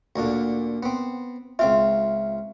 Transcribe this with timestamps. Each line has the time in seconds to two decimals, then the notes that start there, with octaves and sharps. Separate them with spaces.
0.16 D2 A#2 D3
0.83 B3 C4
1.59 C#2 C4 F4 E5